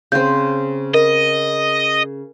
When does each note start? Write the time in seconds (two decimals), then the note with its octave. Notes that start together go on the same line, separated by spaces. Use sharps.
0.12 C#3 C4 G6
0.94 A#4 D#5